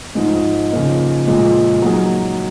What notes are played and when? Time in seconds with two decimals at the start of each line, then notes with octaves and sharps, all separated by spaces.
0.15 G#2 F3 G#3
0.71 C#3 F3 A#3 D#4
1.27 A#2 F3 G#3
1.82 F#3 A#3 D#4 G#4